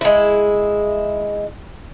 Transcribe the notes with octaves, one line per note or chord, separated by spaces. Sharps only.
G#3 E4